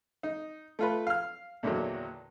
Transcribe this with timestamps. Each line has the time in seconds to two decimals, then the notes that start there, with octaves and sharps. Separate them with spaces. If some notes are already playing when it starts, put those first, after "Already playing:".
0.23 D#4
0.79 A3 F4 B4
1.07 F5 F6
1.63 E2 A#2 D3 D#3 F#3